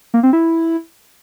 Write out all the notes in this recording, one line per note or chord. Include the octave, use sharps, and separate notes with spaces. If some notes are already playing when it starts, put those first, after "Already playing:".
A#3
C4
E4